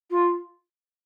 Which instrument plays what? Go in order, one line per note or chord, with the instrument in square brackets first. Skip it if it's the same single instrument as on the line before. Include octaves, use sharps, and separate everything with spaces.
[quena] F4